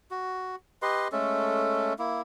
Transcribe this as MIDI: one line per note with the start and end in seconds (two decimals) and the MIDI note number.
0.11 0.56 66
0.82 1.08 67
0.82 1.08 71
0.82 1.08 75
0.82 1.08 84
1.12 1.93 56
1.12 1.93 57
1.12 1.93 61
1.12 1.93 69
1.99 2.22 58
1.99 2.22 64